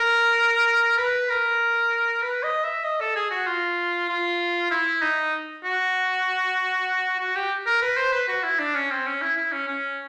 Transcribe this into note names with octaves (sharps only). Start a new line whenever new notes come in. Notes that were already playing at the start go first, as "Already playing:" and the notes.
Already playing: A#4
B4
A#4
B4
D#5
E5
D#5
A4
G#4
F#4
F4
F4
E4
D#4
F#4
F#4
G4
A#4
B4
C5
B4
F#4
E4
D4
C#4
C4
C#4
E4
E4
C#4
C#4